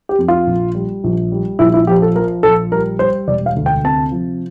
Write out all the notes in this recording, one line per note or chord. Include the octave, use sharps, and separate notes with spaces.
G4
F2
F4
A#1
G3
A#1
G3
A#1 E4
E4
F3 G4
A4
F3 A#4
A#1 A4
G3 A#4
G3 C5
E1 D5
F5
D2
G5
C3 A5
F3